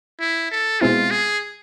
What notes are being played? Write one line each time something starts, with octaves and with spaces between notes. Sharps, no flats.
E4
A4
B2 G#3 C4 E4 F4
G#4